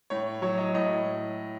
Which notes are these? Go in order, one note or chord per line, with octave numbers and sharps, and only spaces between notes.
A2 C#5
F#3 C#5
D#5
A2 D#5